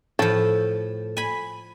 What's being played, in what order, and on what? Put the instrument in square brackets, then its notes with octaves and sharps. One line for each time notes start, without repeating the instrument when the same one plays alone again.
[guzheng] A2 F3 [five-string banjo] A4
[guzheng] G#5 B5